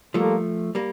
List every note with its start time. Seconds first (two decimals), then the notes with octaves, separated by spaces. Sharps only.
0.14 F3 G3 A3 A#3 F4 A4
0.75 G3 A#3